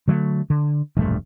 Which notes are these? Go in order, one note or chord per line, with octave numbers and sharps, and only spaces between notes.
D3 F#3 G#3 A3
D3
E1 A#1 G2 A3